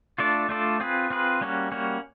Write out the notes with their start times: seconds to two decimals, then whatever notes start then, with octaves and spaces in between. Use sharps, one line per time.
0.18 A3 D4 F4 A4 D5
0.49 A3 D4 F4 A4 D5
0.80 C4 F4 G#4 B4
1.10 C4 F4 G#4 B4
1.41 G3 A#3 C#4 F#4
1.71 G3 A#3 C#4 F#4